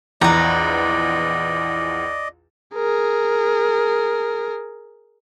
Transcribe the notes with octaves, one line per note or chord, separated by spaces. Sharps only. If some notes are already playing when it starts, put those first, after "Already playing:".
A#1 E2 B4 D5 D#5 A#5
G#4 A#4